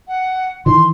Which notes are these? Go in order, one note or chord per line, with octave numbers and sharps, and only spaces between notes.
F#5
D#3 E3 C6